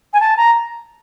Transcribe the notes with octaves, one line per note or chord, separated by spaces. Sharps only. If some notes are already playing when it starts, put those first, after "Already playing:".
G#5
A5
A#5